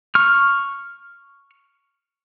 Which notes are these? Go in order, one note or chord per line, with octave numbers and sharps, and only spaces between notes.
C#6 F6